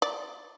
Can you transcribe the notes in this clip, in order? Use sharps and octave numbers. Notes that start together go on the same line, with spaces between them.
D5